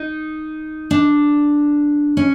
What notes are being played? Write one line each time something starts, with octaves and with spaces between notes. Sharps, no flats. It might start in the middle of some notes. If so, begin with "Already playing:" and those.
Already playing: D#4
D4
C#4